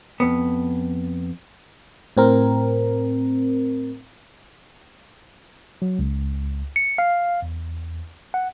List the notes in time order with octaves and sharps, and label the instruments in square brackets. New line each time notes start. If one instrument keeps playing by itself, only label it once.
[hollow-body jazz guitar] F2 B3
[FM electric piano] A2 C4 A#4
[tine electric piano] F#3
C#2
C#7
F5
E2
F#5